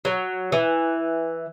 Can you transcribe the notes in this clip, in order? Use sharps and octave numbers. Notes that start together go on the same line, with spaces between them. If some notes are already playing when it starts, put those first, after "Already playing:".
F#3
E3